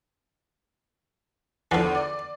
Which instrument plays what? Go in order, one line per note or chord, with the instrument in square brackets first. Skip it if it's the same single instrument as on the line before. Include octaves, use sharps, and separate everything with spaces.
[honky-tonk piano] E2 D3 [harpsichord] E3 F3
[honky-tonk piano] D5